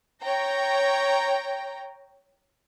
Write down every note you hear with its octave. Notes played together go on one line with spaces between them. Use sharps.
C#5 G5 A#5